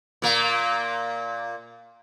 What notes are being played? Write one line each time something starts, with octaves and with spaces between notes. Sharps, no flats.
A#2 A#3